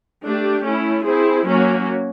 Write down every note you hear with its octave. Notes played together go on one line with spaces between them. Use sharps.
A3 D4 G4
A3 C#4 E4
C4 E4 G#4 C5
F#3 A#3 C#4 F#4